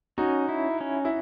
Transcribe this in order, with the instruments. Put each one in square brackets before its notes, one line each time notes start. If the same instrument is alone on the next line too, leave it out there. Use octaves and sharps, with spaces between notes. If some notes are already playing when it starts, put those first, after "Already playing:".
[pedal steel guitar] C#4 [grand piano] D#4 F#4
[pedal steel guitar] E4
C#4
[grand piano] E4